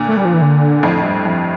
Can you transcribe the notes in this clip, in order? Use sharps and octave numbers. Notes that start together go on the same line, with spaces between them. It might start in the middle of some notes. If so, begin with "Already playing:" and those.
Already playing: A#2 D3
A3
G3
F3
E3
D3
F2 A2
G2
F2